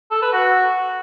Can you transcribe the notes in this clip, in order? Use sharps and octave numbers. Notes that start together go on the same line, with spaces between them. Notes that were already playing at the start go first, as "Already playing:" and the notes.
A4
B4
F#4